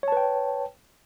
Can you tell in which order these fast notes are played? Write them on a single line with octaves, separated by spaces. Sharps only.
C#5 A5 B4 G5